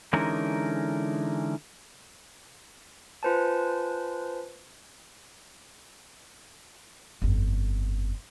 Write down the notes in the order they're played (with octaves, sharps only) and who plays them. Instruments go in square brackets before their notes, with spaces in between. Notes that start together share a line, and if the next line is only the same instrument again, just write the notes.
[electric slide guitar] D3 E3 G#3 C#4 D#4 A#4
[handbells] F4 B4 C5 G#5 A5
[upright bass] G1 F2